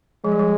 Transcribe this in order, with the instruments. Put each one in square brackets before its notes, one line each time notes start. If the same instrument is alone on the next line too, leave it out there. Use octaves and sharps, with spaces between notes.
[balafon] F3 [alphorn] G#3
[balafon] G3
F3